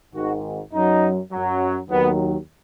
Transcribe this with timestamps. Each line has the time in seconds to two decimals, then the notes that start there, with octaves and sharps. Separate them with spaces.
0.14 G#1 G#2 D#3 F#4
0.73 F#2 F#3 D#4
1.31 F#2 F#3
1.90 D#2 D#3 F#3 B3